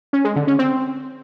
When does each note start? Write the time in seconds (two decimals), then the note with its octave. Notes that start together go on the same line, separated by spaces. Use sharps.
0.13 C#4
0.24 G#3
0.36 D3
0.47 C#4
0.59 C4